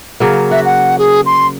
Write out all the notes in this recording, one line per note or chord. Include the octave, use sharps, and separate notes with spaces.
C#3 F#3 A#3
F#4 E5
F#5
G#4
C6